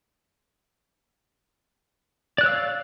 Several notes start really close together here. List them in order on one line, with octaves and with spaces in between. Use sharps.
D5 F#6 C#5 E6 F5